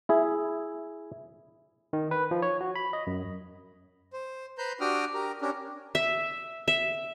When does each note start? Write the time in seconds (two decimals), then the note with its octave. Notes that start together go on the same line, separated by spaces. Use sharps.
0.09 E4 G#4 E5
1.93 D#3
2.11 B4
2.31 F3
2.42 C#5
2.61 F#4
2.76 B5
2.93 D#5
3.07 F#2
4.13 C5
4.58 B4 C5 A#5 C6 G6
4.81 D4 F#4 G4 G5 D#6 F6
5.14 G4 A#4 A#5
5.42 C#4 D4 G4 A#4
5.95 E5
6.68 E5